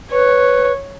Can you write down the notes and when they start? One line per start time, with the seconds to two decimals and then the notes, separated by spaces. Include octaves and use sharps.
0.11 B4 C#5